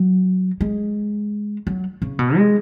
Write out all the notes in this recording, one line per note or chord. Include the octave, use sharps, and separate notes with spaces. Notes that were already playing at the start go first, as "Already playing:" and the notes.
Already playing: F#3
G#3
F#3
C#3
B2
G#3